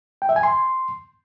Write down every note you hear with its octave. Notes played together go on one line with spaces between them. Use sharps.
G5
E5
G#5
C6